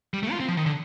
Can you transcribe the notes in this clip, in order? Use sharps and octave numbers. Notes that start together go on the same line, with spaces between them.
G3
A3
F4
C4
F3
D#3
D3